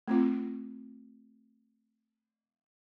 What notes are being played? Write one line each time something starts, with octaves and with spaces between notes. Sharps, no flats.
A3 C4 F4